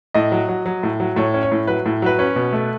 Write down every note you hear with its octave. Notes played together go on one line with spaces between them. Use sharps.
A2 D#5
F#3
F#3
F#3
A2
F#3
A2 C#5
C#4
C#5
A2
F#3 B4
A2
F#3 B4
C#4 B4
B2
A3